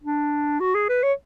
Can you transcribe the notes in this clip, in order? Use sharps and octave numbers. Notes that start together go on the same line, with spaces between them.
D4
F#4
G#4
B4
C#5